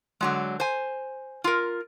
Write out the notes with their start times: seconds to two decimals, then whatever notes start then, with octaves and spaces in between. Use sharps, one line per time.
0.21 D3 F#3 G#3
0.60 C5 G#5
1.44 F4 A#4